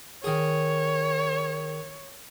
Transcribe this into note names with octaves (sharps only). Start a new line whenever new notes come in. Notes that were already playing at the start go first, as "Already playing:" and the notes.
D#3 G#4 C#5